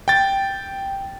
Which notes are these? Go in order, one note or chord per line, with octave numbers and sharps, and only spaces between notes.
G5 A6